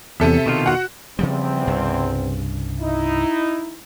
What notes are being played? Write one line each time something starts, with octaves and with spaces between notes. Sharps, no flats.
E2 C3 A4 E5
B2 D#3 F4
F#4 F#5
E2 C#3 F3 G3 C4
C2 G2 C#3
D#4 E4